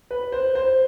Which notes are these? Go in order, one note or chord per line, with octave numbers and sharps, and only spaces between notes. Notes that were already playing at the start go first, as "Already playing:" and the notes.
B4
C5
C5